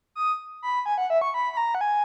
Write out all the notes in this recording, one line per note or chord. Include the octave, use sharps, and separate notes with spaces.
D#6
B5
G#5
F#5
E5
C#6
B5
B5
A#5
F#5
G#5